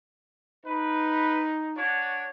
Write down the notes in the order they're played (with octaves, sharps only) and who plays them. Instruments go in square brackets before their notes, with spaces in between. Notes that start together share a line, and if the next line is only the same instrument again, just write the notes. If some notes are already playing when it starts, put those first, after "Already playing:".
[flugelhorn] D#4 [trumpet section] B4
[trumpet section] D4 F#4 C#5